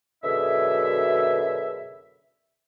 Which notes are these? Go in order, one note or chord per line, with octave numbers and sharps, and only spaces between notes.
F#2 B2 D3 G#4 E5